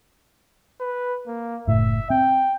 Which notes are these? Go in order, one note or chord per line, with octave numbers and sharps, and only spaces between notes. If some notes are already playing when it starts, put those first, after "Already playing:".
B4
A#3
F#1 A2 E5
C4 G5